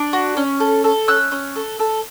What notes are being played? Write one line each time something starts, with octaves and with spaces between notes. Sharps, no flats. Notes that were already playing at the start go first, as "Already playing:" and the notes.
Already playing: D4
F#4
C#4
A4
A4
C#4 E6 F#6
C#4
A4
A4